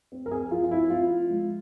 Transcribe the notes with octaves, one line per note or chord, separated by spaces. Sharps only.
C4
A#4
C4 G#4
F3 F4
F4
C4 E4
C4 F4
F3
G#3